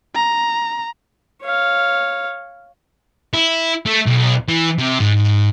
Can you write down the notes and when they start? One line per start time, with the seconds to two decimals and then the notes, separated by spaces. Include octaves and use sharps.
0.15 A#5
1.42 C#5 F5
3.34 E4
3.86 A3
4.06 B1
4.48 E3
4.79 C3
5.00 G#2